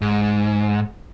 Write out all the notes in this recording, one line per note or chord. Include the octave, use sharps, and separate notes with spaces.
G#2